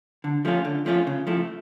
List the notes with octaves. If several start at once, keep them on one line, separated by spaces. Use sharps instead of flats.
D3
F3 A3 C#4 F4
D3
F3 A3 C#4 F4
C#3
F3 A3 E4